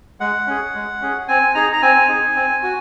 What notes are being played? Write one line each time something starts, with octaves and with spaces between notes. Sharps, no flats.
G#3 F#5
C#4 G#4
G#3
C#4 G#4
C4 G#5
D#4 G#4 A#5
A#5
C4 G#5
D#4 G#4
C4
F#4